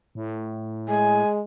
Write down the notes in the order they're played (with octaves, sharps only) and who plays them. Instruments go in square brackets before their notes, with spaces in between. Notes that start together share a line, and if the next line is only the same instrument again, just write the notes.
[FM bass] A2
[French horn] G#3 [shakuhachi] G#5